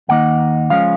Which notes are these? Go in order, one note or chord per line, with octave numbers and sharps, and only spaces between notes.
D#2 D#3 A#3 D#4 F#5
C#2 C#3 F3 G#3 C#4 F5